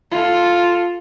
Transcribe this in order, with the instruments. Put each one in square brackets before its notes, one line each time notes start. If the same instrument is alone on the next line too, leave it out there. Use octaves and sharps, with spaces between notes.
[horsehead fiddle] F4 A4